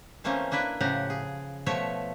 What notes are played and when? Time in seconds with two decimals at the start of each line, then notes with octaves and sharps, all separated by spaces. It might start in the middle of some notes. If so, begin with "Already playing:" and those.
0.24 E3 A3 A#3 C4 C#4
0.51 A#3 D4 E4 B4 E5
0.81 A2 C#3 F3 G4 F#5 A#5
1.10 G#4
1.66 B2 F3 A3 C#5 E5